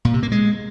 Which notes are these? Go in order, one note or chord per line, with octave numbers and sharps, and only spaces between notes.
A#2
C3
A#3
G#3